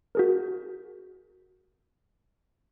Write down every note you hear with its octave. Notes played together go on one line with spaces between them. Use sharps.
F#4 G#4 A#4